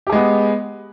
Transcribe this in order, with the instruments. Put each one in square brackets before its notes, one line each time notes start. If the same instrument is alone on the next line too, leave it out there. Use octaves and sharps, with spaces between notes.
[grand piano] G4
G#4
G#3
B3